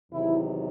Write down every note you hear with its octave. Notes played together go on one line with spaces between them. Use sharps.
E2 C3 D#3 F#3 E4